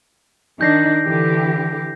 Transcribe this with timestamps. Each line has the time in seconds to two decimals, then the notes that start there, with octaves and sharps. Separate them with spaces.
0.61 D#3 D4 D#4 G6 A#6 C7
1.05 D3 E3 G4